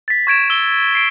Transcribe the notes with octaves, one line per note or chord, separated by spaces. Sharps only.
A6 B6
C#6 G#6 D7 E7
E6 G7
C7 D7